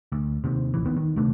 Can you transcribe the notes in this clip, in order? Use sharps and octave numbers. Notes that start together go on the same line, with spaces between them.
D2
D#2 C3
A#1 E3
D#2 D#3 B3
D#3
D#1 C3 A3 D4